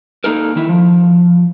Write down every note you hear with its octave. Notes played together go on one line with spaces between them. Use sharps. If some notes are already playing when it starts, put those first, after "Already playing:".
A#3 D#4 A4 A#4
D#3 E4
F3